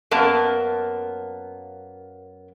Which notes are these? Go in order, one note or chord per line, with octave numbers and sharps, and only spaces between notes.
F#2 A#3 B3 A5